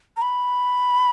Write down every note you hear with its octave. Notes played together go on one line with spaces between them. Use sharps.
A#5
B5